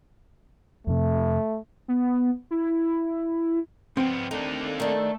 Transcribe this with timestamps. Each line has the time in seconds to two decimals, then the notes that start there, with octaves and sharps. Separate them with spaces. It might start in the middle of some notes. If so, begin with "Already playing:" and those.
0.87 F2 C3 A3
1.88 B3
2.51 E4
3.97 F3 B3 C4 G5
4.31 A3 A#3 D4 D#4
4.80 D#3 A3 D4 A4